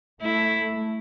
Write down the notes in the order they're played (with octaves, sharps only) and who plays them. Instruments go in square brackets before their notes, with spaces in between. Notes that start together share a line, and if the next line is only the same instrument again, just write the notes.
[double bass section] A3 [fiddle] E4